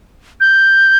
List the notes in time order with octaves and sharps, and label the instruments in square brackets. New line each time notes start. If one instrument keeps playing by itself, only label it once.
[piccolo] G6